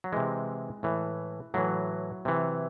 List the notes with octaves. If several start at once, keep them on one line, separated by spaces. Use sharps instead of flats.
F#3
C3 E3 G#3
A2 E3
A2 E3 F#3
C3 E3